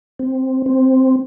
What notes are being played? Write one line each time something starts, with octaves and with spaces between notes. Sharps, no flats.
C4
C4